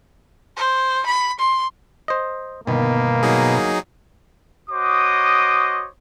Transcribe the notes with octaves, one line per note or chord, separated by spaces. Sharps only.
C5
B5
C6
C5 D#5
G1 B2 D#3 A#3
F#3 D#4 G#4
F#4 C5 C#5 D#5 D6 D#6